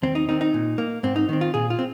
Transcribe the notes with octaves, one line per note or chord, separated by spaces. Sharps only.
D#2 C4
D#4
D#3 C4 D#4
D#4
A#2
A#3
G#2 C4
D#4
D#3 C4
F4
A#2 G#4
F4
C4